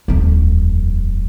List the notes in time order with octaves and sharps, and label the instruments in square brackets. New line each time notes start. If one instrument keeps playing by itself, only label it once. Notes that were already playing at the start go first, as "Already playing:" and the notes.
[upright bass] D#1 F2